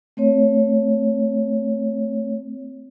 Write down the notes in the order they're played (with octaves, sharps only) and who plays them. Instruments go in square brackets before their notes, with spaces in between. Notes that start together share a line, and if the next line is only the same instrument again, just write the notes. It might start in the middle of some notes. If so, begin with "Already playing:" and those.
[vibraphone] A3 C4 C#5